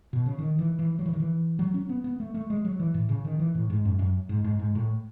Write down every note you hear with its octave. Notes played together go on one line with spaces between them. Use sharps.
B2
C#3
D#3
E3
E3
F#3
E3
D#3
E3
F#3
C#4
B3
B3
A3
A3
G#3
F#3
E3
A2
C#3
D#3
E3
A2
G#2
F#2
F#2
G#2
G#2
G#2
A2